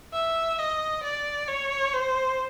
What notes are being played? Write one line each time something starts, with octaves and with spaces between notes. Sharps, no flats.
E5
D#5
D5
C#5
C5